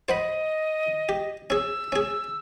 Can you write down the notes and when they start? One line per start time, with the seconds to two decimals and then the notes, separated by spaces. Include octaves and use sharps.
0.09 C5 D#5 F#5 B5
1.09 G4
1.50 C#4 G#4 E6
1.92 C#4 G#4